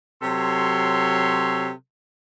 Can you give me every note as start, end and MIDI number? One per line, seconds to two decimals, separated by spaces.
0.22 1.71 48
0.22 1.71 54
0.22 1.71 69
0.22 1.71 73
0.22 1.71 84